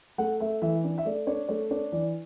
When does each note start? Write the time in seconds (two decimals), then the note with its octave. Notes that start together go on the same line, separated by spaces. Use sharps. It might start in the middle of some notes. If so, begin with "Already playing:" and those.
0.18 A3 F#5
0.40 A3 E5
0.62 E3 E5
0.84 D4 D5
0.98 E5
1.05 A3 D5
1.27 D4 C#5
1.48 A3 C#5
1.71 D4 C#5
1.92 E3 D5